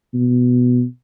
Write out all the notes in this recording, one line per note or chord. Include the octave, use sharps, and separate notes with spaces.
B2